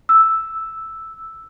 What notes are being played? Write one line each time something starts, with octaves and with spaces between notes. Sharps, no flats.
E6